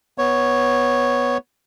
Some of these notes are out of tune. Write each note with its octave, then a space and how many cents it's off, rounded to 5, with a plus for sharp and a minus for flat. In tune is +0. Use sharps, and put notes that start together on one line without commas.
B3 +0 C#5 +0